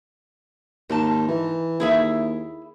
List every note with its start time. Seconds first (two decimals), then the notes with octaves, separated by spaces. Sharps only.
0.89 D#2 G#2 D#4 A5
1.28 E3
1.80 D#2 E4 G#4 E5